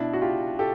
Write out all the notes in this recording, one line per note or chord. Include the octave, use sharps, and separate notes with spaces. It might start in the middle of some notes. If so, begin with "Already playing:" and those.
Already playing: B2 D4 E4
F#4
F4 G4
G4 A4